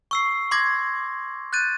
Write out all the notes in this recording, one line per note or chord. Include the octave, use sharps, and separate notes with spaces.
C#6 E6 C7
C6 D6 G#6 A#6
F#6 G6 A6 D#7